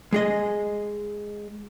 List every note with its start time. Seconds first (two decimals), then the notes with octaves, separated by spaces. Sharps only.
0.13 G#3 G#4 D#5